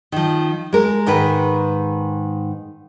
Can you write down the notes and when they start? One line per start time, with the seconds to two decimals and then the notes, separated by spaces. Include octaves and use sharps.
0.12 D#3 F3
0.73 G#3 A#4
1.06 G#2 D#3 A#4 B4